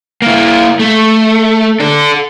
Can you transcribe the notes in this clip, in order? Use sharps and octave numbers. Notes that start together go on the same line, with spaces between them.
A#3 E4
A3
D4 A4